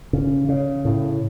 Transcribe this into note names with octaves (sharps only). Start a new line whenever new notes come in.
C#3
C#3
A2